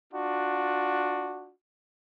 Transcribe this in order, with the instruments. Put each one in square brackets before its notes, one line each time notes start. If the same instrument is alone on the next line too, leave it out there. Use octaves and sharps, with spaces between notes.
[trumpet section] D4 F4 F#4